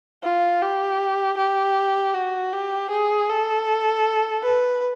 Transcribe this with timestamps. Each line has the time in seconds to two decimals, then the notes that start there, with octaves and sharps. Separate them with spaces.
0.23 F4
0.62 G4
1.37 G4
2.14 F#4
2.52 G4
2.90 G#4
3.29 A4
4.43 B4